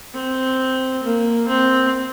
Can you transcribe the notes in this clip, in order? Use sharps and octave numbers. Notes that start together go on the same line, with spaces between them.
C4
A#3
C4